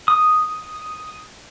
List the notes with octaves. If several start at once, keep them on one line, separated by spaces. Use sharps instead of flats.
D#6